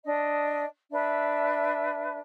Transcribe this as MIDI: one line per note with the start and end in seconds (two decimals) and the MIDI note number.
0.04 0.63 62
0.04 0.63 75
0.91 2.18 62
0.91 2.18 71
0.91 2.18 76